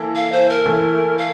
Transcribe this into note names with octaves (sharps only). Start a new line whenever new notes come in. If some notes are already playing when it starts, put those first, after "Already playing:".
Already playing: E3 A#3 E4 A4
F5
C5
A#4
E3 A3 E4
F5